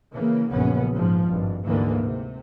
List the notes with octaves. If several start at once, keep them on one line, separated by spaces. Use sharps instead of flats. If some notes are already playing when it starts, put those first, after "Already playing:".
C#3 E3 A#3
A#1 F#2 C#3 B3 C#4
G#2 F3
G#1 G2
D2 G#2 D3 E3 A#3
C3